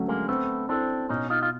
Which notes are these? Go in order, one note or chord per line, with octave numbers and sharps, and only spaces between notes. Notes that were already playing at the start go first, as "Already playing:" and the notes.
Already playing: D3 F#3 A3 C#4
G#3 A#3
A3 B3 C4
C4 D4 E4 A4 C5
B2 C#4 D#4
D#4 F4
F4